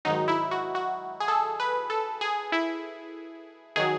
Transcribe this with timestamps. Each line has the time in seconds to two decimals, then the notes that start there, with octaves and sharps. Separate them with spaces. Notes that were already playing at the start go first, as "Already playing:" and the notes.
0.05 G#2 D#3 F#3 D#4
0.28 E4
0.51 F#4
0.75 F#4
1.20 G#4
1.28 A4
1.60 B4
1.90 A4
2.21 G#4
2.52 E4
3.76 D#3 F#3 G#4